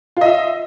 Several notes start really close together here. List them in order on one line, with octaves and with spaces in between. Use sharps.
F4 D#5 E5